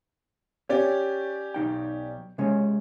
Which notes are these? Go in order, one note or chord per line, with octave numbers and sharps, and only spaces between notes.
C#4 G4 C#5 D5
B1 D#4 G5
C3 G#3 C#4